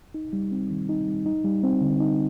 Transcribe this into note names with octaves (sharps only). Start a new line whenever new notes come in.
D#4
G3
C4
D#3
D#4
G3
D#4
G3
C4
D3
D#4